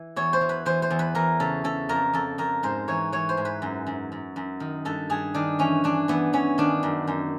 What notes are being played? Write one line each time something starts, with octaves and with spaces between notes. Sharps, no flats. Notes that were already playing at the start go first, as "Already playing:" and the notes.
Already playing: E3
E2 C#5
C5
E3
B4
E3 C5
C5
E2
B4
E3 A#4
C#3 A4
C#3 A4
F2 A#4
F2 A4
F2 A#4
G#2 C5
E3 C#5
E3 C#5
C5
G#2
B4
F#2
F#2
F#2
F#2
D#3
G2 A4
G2 G#4
D#3 D4
E3 C#4
E3 D4
E3 B3
E3 C#4
D#3 D4
F#2
F#2